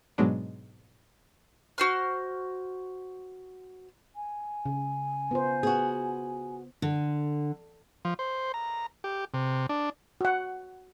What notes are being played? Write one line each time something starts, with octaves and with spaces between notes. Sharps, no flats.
G#2 B2 F#3 G#3 B3 D4
F#4 C5 F6
G#5
C#3
B3 F4 C5
B3 F#4 G#4
D3
F3
C5
A#5
G4
C3
D4
F#4 F#5